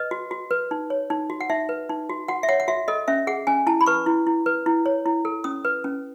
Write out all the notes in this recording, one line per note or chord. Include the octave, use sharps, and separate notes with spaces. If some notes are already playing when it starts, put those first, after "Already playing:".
Already playing: B4 D#5
F#4
F#4
B4
D#4
C#5
D#4
F#4
F#5
D#4 E5
B4
D#4
F#4
F#4 F#5
E5
C#5 F#5
F#5
F#4 E5
A4 D#5
C#4 E5
G#4 F#5
C#4 G#5
E4 A5
B5
B4 C#6
E4
E4
B4
E4
C#5
E4
A4
C#4 D#6
B4
C#4